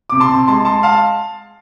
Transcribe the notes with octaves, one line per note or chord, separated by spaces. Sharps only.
C3 D6
A5 C6
C3
G#3 A5 C6
G#3 A5 C6
G#3 F5 A5